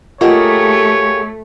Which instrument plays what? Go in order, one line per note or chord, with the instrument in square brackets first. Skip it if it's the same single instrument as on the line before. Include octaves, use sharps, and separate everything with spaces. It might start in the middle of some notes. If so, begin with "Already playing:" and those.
[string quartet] A3 [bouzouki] A#3 G4 G#4 [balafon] F4 D#5 F#5 [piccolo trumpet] C#5